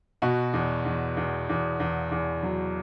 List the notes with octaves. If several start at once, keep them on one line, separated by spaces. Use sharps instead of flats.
B2 F#4
E2
E2
E2
E2
E2
E2
F#3